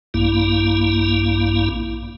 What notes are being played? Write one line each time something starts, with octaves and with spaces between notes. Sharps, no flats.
A#1 G2 A#3 E4